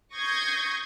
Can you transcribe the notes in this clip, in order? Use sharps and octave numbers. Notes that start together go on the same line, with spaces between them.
C#6 D#6 G6 G#6 A#6 C7